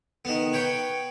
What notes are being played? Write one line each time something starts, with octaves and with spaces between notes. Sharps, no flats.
D#3 B3
B4 C#5 G5